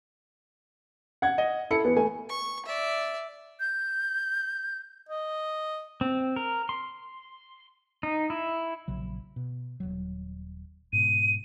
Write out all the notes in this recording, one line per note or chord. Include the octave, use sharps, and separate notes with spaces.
F#5 G#6
D#5
E4 A4 C#7
E2 B3
A3 G#5
C#6
D5 E5
G6
D#5
C4
A#4
C6
D#4
E4
A#1 C#3 F#3
B2
D#1 G#1 F#3
G#2 B2 D#7